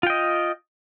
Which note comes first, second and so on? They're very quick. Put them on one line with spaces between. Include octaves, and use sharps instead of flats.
F4 G5 D#5